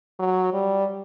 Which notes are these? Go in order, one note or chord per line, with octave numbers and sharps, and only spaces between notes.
F#3
G3